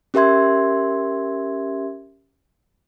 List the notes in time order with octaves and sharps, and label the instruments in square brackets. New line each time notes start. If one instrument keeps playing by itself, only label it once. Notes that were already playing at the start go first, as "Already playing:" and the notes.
[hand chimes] C#4 G4 A#4 E5 C6 G#6